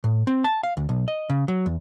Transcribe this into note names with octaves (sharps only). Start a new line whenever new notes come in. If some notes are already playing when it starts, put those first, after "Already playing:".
A2
C4
A5
F5
D2
B1
D#5
C#3
F#3
E2